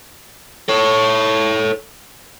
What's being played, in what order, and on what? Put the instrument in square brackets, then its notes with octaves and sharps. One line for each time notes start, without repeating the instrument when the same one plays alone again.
[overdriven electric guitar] A4 C#5